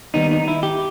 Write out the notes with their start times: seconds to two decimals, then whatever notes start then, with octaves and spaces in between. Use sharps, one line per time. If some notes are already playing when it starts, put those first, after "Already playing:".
0.14 D#2 D#3 G3 B3 D#4
0.31 D#4
0.48 E4
0.63 G4